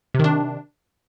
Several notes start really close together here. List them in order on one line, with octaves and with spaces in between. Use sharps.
C3 D#3 D4